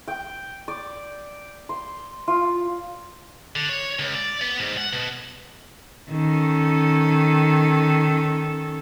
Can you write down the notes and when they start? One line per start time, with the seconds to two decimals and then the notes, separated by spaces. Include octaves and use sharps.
0.08 G5
0.68 D5
1.69 C6
2.28 F4
3.56 D3
3.69 C#5
3.99 C#2
4.14 D5
4.41 B3
4.60 G#2
4.77 F#5
4.93 B2
6.11 D#3 C#4 A4